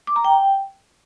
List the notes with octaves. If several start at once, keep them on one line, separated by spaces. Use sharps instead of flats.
D6
A#5
G5